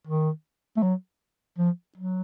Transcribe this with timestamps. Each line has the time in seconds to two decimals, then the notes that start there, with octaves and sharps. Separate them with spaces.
0.07 D#3
0.77 A3
0.83 F#3
1.58 F3
1.97 F#3